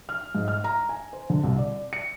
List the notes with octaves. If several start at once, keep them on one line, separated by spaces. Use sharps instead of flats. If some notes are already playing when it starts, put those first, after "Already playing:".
F6
G#2
F6
A#5
G#5
C5
D3
C2
D5
C#7